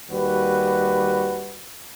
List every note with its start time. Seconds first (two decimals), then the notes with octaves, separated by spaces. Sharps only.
0.10 D#2 G3 F#4 B4